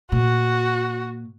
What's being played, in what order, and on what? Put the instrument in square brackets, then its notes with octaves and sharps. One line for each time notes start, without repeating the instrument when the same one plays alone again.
[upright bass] A#2 [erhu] F#4